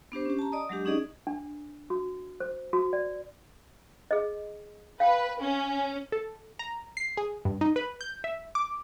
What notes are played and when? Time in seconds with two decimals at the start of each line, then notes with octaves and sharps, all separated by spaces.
0.12 B3 D4 G4 C5
0.25 C#4 G4
0.39 A5 A#5
0.52 D5 D#5 D#6
0.69 F#3 G#3 D4 G4
0.85 C#4 D#4 G#4 D5 D#5
1.27 D4
1.90 F#4
2.40 C5
2.73 F#4
2.93 D5
4.11 G#4 D#5
5.00 B4 F5 G5
5.40 C#4
6.12 A4
6.59 A#5
6.97 C7
7.17 G#4
7.45 G2
7.61 D#4
7.76 B4
8.01 G6
8.24 E5
8.55 D6